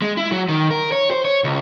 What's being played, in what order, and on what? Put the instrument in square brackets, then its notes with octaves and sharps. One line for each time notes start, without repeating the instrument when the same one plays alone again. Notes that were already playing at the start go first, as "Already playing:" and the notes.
[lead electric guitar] G#3
E4
F#3
D#3
A#4
C#5
C5
C#5
C#2